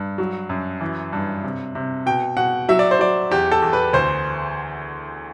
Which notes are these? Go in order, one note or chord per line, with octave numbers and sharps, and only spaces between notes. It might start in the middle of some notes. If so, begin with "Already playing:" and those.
Already playing: G2
F#3
F#2
E3
G2
C3
C3
B2 G5
B2 F#5
F#3 E5
D5
C5
F#3 D5
E2 G4
A4
E2
B4
D2 C5